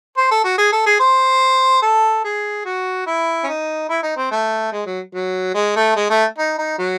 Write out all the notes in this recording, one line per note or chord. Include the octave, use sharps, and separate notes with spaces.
C5
A4
F#4
G#4
A4
G#4
C5
A4
G#4
F#4
E4
C#4
D#4
E4
D#4
C4
A3
G#3
F#3
F#3
G#3
A3
G#3
A3
D#4
D#4
F#3